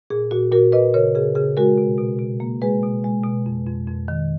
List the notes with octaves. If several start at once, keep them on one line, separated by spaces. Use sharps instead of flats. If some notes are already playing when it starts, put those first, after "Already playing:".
A#2 G#4
A#2 F#4
A#2 F#4 A#4
A#2 B4 D#5
C#3 A#4 C#5
C#3 G#4
C#3 G#4
G#3 F#4 A#4
B2
B2
B2
A#3
G#3 G#4 B4
B2
G#3
B2
F2
F2
F2
D#3